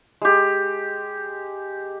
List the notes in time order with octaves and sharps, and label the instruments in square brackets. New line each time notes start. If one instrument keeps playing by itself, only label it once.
[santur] G#3 G4